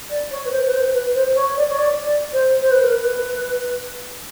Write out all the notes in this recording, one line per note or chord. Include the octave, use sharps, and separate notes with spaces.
D5
C#5
B4
C5
B4
C5
B4
C5
C#5
D5
C#5
D5
D5
C5
C5
B4
A#4
B4